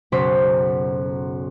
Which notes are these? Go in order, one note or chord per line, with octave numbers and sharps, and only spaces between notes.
B1 F#2 C#3 C#4 C5 B6